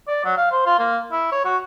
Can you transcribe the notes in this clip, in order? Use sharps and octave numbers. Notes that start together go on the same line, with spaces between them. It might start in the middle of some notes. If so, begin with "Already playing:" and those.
D5
F#3
F5
C5
F4
A#3
E4
C#5
F#4